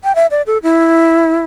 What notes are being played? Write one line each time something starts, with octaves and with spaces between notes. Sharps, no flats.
G5
E5
D5
A4
E4